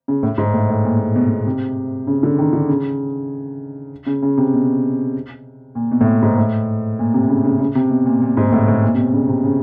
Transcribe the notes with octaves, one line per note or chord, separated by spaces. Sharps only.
C#3
A2
G#2
A2
A2
A#2
A#2
B2
B2
C3
C#3
D3
D#3
D3
C#3
C#3
C#3
C3
B2
A#2
B2
A2
A#2
G#2
A2
A#2
C3
C#3
C#3
C#3
C3
B2
A#2
A#2
G#2
A2
A2
A#2
C3
B2
C#3
C3
C#3